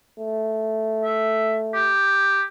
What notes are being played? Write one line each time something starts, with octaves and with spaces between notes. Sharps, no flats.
A3
E5
G4